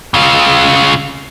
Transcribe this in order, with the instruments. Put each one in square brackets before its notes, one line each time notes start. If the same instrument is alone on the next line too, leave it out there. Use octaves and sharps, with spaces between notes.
[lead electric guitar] C#3 F4